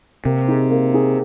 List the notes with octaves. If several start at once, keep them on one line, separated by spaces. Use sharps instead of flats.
C3 A#3
D#4 G#4
A#3
D#4 G#4